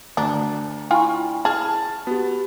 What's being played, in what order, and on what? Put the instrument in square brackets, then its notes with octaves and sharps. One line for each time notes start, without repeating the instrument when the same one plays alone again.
[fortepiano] D2 [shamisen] D4 [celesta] A#5
[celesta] E4 B5 C#6 [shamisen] F4 G5 G#5
[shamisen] G#4 [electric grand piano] A5 [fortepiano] F6
[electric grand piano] B3 [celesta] F#4 G4